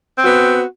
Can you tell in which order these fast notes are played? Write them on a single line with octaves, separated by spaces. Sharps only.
C4 F#4 B3